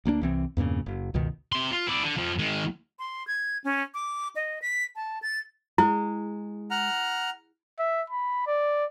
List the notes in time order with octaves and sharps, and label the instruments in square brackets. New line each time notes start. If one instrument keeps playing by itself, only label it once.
[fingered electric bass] D2 A#3 B3 D4
C2 E3 C4
E2 G2 A#2 C#3
F#1
G1 C#2 B2 D#3
[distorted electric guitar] C3 C6
F4
E4 D5
D3
F2 F3
D#3 G#3
[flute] C6
G#6
C#4
D6
D#5
B6
A5
A6
[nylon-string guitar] G#3 [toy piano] E4
[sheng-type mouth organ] F#5 A#5 F6
[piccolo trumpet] E5
B5
D5